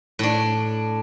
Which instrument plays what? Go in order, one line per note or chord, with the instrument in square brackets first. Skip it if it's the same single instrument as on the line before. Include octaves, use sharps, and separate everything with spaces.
[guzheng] A2 D4